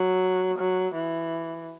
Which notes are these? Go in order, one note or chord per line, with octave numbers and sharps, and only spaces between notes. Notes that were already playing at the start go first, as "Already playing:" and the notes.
Already playing: F#3
F#3
E3